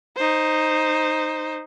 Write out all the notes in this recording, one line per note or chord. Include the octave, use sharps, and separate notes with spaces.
D#4 C5